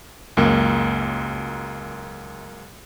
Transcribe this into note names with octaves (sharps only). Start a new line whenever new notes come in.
C#2 F#2 A#3